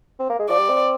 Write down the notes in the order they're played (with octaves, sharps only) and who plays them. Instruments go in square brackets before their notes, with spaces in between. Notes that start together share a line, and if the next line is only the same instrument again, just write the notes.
[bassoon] C4
A#3
G#3
[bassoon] F3 [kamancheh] D5
[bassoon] G3
C4